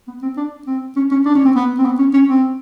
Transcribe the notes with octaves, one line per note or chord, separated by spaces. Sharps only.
B3
C4
D4
C4
C#4
C#4
D4
C#4
C4
B3
C4
B3
C#4
C#4
C4